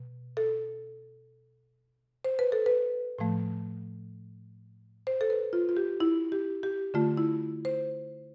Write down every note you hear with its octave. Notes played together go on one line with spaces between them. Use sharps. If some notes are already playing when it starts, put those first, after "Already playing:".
Already playing: B2
A4
C5
B4
A4
B4
A2 F3 A3
C5
A4
B4
F4
F4
G4
E4
G4
G4
D3 A3 F4
E4
C5